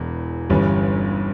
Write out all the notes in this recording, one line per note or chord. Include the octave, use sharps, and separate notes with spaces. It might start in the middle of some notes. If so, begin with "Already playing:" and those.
Already playing: E1 E2
G1 G2 E3 G3 C#4